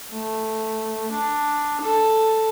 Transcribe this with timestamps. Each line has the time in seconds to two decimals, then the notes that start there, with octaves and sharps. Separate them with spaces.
0.13 A3
1.12 D4
1.81 A4